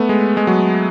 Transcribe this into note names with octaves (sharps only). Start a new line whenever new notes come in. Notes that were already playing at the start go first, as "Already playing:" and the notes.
Already playing: A3 B3
G#3
G#3
F#3